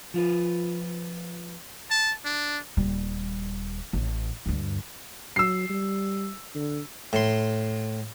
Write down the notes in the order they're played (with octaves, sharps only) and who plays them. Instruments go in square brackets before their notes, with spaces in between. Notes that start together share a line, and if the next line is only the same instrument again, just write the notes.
[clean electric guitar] F3 F4 B4
[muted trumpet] A5
D4
[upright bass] D#1 G3
A1
D2 G2
[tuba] F#3 [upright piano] E6 C7
[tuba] G3
D3
[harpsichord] A2 C6